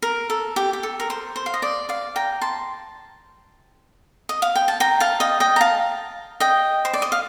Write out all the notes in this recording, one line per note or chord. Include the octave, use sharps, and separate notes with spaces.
A#4
A4
G4
G4
A4
A#4
C5
C5
F5
D#5
D5
D5 F5
G5 A#5
A5 C6
D#5
F5
G5
A5
G5 A#5
F5 A5
D#5 G5
D#5 G5
A#5
F5 A5
D#5 G5
C5
D5
D#5
F5